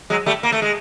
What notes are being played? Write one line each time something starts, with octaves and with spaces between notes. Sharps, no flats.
F#3 G#3
G3 A3
A#3
A3
G#3